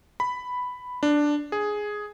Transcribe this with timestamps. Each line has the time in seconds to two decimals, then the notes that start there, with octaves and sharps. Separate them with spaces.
0.20 B5
1.03 D4
1.52 G#4